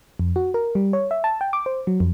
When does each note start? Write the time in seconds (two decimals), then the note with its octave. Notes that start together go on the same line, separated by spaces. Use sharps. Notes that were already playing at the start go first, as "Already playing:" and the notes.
0.19 F2
0.36 F#4
0.54 A#4
0.75 G3
0.93 C#5
1.11 E5
1.24 A5
1.41 G5
1.53 D6
1.66 C5
1.87 F#3
2.00 F2